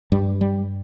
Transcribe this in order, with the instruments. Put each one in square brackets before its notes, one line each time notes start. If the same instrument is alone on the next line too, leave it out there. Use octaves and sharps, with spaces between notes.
[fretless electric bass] G2 G3
G3